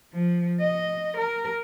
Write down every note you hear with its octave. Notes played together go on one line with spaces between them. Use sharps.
F3
D#5
A#4